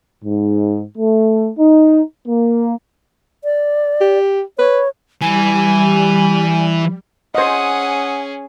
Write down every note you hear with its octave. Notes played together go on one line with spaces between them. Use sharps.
G#2
A3
D#4
A#3
D5
G4
B4 C#5
E3 G3 G#5
C#4 G#4 C5 D#5 F#5 D#6